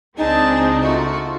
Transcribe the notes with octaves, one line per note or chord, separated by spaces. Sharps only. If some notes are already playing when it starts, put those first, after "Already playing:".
C#2 C4 D4 D#4 G#4 G#5 A5
A3 F4 F#4